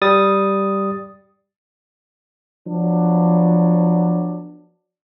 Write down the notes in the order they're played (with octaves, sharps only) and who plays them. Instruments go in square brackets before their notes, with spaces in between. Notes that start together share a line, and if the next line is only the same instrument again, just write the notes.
[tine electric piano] G3 D#6 A6
[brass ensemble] F3 F#3 B3 D4